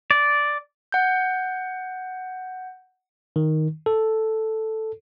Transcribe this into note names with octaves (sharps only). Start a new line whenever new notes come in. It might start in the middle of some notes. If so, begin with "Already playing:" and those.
D5
F#5 G6
D#3
A4